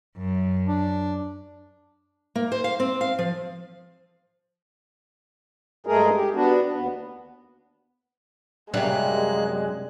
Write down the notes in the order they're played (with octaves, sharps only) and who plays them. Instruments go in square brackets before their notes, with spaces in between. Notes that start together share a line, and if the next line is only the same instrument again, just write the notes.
[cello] F#2
[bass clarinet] D4
[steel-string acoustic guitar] A#3
C5
F5
C4
F5
F3
[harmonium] G2 G#3 A3 G#4 A#4
G4
B3 D4 F#4
D#2 B3
[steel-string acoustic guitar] F#2 C3 [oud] G3 [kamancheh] G#3 [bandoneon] A#3 F#6